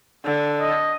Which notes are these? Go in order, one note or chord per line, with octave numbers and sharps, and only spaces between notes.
D3
D#5